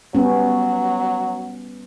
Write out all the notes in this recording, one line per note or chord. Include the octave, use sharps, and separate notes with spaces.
F#3 G3 B3 C#4